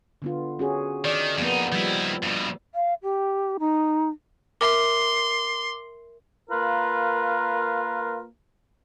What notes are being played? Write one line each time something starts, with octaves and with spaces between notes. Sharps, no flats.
D3 B3 F4
C#4 F#4 G#4
D#3 D5
F2 F3 A#3 B3 D#4
D#3 F3 G3 E4
G2 B2
F5
G4
D#4
A#4 E5 C6 D6
A#3 F4 A#4 B4